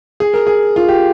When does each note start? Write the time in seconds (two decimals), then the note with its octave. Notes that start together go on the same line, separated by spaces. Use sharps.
0.20 G#4
0.34 A#4
0.47 G#4
0.76 F4
0.89 G4